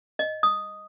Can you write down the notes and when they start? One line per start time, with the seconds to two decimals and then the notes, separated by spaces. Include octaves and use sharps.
0.19 D#5
0.43 D#6